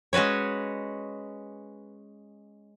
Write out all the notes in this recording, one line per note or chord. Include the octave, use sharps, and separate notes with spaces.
G#3 C#4 F#4 B4 C#5